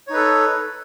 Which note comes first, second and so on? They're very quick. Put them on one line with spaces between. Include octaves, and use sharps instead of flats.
C#5 D#4 B4 A4